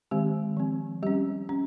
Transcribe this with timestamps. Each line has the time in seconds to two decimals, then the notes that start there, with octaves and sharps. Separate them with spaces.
0.11 D#3 G#3 C4 G4
0.57 F3 C4
1.03 G3 C#4 G4
1.49 C#4